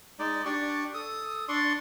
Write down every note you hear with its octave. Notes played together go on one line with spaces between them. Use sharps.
G#3 D#4 D5
D4 G4 D5 C#6
A4 D#6
D4 D5 C6 C#6